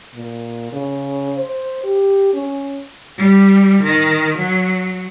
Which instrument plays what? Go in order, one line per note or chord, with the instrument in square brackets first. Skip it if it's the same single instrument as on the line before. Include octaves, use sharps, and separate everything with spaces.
[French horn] A#2
C#3
C5
G4
C#4
[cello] G3
D#3
F#3